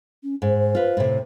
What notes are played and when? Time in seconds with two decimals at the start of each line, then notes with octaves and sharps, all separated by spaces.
0.23 C#4
0.42 G#2 C5
0.75 F4 B4
0.97 A2 C3